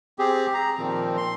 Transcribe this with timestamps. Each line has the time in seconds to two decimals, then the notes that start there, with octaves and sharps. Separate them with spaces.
0.19 C4 G4 G#4
0.54 A#5
0.78 A#2 D#3 F3 C4
1.17 C6